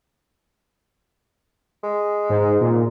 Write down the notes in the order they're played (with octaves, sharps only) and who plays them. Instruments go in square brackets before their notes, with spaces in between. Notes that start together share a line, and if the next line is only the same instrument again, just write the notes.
[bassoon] G#3
[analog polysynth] G#2
A#2